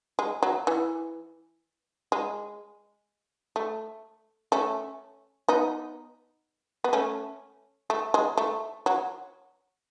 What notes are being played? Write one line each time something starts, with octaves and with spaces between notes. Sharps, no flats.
G#3
F#3
E3
G#3
A3
A3 C#4
B3 D#4
B3
A3 C#4
A3
G#3
A3
F#3